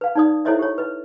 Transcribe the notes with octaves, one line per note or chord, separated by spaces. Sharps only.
B4 F5
D#4 D5 D#6
E4 A4 C5 C#5 D#5 E5
G4 C#5
B4 D#5